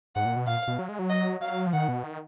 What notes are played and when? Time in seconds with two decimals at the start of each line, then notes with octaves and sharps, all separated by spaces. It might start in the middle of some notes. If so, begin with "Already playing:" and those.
0.15 G#2 F#5
0.26 A#2
0.36 B2
0.47 A#2 F5
0.68 B2
0.79 F#3
0.89 G#3
0.99 F#3
1.10 D#5
1.41 F#3 F5
1.67 F3
1.73 D#3 F#5
1.88 B2
2.04 D#3